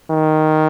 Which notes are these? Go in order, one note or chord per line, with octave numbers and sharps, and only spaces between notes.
D#3